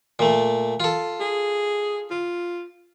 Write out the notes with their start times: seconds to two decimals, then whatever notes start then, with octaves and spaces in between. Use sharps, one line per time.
0.19 A#2 A3
0.80 F4 A4
1.20 G#4
2.10 F4